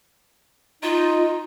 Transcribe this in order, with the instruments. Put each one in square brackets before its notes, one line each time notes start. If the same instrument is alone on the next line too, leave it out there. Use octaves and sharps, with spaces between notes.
[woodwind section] D#4 [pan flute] F4